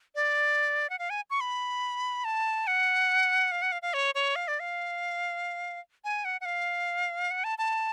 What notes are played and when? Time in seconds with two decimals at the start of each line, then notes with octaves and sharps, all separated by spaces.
0.15 D5
0.90 F#5
0.99 F5
1.10 G#5
1.30 C#6
1.41 B5
2.25 A5
2.67 F#5
3.51 F5
3.62 F#5
3.72 F5
3.82 F5
3.94 C#5
4.15 C#5
4.36 F5
4.48 D5
4.60 F5
6.04 G#5
6.25 F#5
6.41 F#5
6.45 F5
7.31 F#5
7.44 A5
7.58 A5